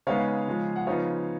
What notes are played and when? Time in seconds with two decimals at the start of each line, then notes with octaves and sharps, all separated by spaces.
0.07 C#3 G#3 B3 D#4 C#5 F5
0.47 C#3 F3 G#3
0.76 F#5
0.87 C#3 F3 B3 D#4 C#5 F5